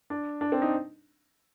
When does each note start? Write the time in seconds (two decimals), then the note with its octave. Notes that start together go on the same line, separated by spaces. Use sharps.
0.10 D4
0.41 D4
0.52 C4
0.62 D#4